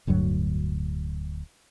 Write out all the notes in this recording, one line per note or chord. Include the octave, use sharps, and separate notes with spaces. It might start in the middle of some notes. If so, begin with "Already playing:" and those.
D1 D2 G2 F#3